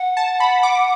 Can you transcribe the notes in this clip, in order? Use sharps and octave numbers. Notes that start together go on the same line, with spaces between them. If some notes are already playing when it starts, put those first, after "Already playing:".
Already playing: F#5
A5
B5
D6